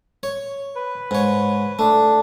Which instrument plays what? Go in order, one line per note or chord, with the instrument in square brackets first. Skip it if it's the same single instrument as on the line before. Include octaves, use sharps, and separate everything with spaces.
[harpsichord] C#5
[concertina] B4
[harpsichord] G#2 C#5
[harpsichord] A3 [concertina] D4